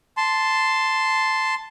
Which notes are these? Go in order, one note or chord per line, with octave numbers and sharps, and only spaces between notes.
A5 C6